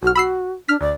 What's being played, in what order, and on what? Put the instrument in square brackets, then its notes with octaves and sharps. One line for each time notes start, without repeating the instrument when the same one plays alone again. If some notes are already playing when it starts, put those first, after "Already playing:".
[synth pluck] B1 F6 [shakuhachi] F#4
[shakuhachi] F#4 [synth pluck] B5 E6 C7
[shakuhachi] D4 [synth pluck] F6 B6
[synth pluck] D2 [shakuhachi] D5